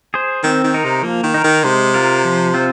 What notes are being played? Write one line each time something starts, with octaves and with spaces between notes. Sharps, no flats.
G#4 C5
D#3 C4
D#3
D#4 A#4
C3
F3 A#3
D#3
D#4 A#4
D#3
C3 G#3
F4 A#4
F3
C4 F4